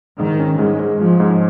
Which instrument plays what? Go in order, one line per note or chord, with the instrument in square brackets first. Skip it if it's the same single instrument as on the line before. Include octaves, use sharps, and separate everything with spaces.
[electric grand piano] G#2 [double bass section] D#3
[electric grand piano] C#4
[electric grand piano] G#2 [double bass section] G#3
[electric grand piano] G#2
[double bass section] F3 [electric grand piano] G#3
[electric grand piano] G#2